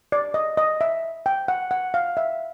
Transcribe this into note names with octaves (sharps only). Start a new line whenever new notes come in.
D5
D#5
D#5
E5
G5
F#5
F#5
F5
E5